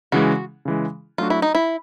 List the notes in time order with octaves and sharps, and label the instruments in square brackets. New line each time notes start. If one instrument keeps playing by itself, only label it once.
[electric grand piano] C#3 E3 G#3 [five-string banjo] F#4
[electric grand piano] C#3 E3 G#3
[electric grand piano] F#3 A3 D4 F#4 [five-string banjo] F4
[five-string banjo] E4
D#4
E4